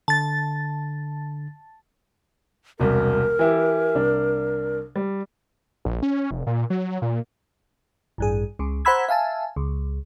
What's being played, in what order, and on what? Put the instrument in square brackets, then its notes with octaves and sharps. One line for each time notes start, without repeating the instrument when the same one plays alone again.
[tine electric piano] D3 [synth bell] A5 A6
[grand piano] E1 C2 [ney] A#4
[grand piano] E3 E4 G4
C2 D4
G3
[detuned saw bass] A#1
C#4
F1
A#2
F#3
A#2
[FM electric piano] A1 G2 G#4
C#2 C#3
C5 F#5 A#5 B5 E6 G#6
E5 F5 G#5 A5
C#2